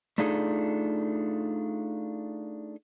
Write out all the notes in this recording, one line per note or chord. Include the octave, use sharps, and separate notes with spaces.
A3 D4 D#4 F4 G#4 A4